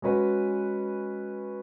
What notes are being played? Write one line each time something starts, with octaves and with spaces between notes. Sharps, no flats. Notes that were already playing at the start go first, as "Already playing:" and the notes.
G#3 C#4 F#4 B4